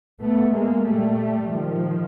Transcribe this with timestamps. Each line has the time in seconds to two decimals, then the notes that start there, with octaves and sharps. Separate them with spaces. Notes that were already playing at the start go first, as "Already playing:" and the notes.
0.21 A3 B3
0.54 G#3 A#3
0.87 A#2 G3 A3
1.52 D#3 F3